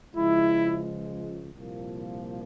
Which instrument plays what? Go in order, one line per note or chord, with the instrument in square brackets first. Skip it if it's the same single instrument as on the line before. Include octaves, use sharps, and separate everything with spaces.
[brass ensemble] C#2 C#3 F3 G#3 E4
C2 A#2 F3 A#3